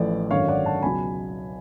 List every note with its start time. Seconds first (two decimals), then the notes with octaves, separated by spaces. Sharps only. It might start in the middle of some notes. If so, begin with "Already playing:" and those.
Already playing: A1 A2 F3 D5
0.30 G#1 F#2 D3 C#5 F5
0.48 D5 F#5
0.66 F#5 A5
0.82 C#2 B2 F#3 G#5 B5